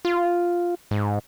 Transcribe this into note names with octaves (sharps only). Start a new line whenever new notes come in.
F4
G#2